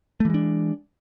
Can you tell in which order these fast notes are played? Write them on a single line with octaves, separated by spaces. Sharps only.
A3 E3 G#3 D4